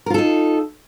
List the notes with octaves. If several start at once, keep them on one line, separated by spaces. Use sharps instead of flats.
D#4 F4 A4 A#4